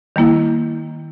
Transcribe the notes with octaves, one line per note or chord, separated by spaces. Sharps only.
D#3 G3 A#3 E4